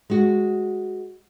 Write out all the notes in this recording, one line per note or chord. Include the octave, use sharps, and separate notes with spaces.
G#3 F#4